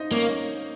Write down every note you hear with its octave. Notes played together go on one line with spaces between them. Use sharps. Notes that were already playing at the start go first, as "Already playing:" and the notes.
Already playing: D#4 C5 D#5
A#3 C#4 C#5